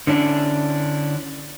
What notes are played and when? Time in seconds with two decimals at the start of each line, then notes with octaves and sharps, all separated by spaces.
0.07 D3 C#4 D4 E4